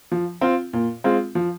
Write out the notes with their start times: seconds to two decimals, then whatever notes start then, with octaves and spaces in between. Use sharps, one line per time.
0.12 F3
0.41 C4 F4
0.73 A#2
1.04 G#3 C4 F4
1.35 F3